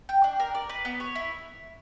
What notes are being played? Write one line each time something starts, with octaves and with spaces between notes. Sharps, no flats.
G5
D4
A#4
D5
B4
B3
C#5
E4